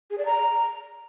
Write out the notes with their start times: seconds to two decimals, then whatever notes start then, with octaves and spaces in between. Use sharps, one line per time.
0.10 G#4
0.18 D5
0.26 A#5